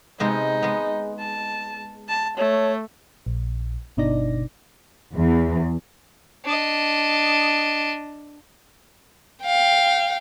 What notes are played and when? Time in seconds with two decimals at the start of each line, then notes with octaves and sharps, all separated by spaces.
0.20 C3 G#3 B3 D#4
0.62 G#3 B3
1.19 A5
2.09 A5
2.38 A3 C#5
3.26 A#1
3.97 G1 B2 D4 D#4 D5 A#6
5.15 E2
6.45 D4 D#5
9.45 F5 G5